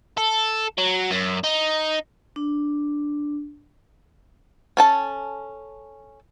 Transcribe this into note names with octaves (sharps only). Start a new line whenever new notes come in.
A4
F#3
F#2
D#4
D4
C#4 A4 A5